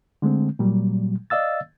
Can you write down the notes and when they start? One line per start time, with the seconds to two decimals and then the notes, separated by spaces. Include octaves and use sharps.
0.22 D3 G#3 A3 C4
0.59 A#2 F#3 G3
1.30 D5 D#5 F5 E6 A6